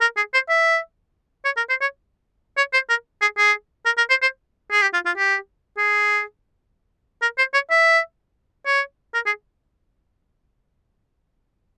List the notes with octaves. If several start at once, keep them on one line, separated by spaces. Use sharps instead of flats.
A#4
G#4
C5
E5
C#5
A#4
C5
C#5
C#5
C5
A#4
G#4
G#4
A#4
A#4
C5
C5
G#4
G4
F4
F4
G4
G#4
A#4
C5
C#5
E5
C#5
A#4
G#4